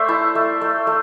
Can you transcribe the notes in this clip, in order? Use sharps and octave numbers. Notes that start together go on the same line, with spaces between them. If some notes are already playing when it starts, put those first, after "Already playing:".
Already playing: A3 C5 D5 E5
E4 A5
A3
A3
A3